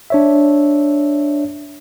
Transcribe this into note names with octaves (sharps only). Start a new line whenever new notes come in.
D4 C#5 E5